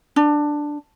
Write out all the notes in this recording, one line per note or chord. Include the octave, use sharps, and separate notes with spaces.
D4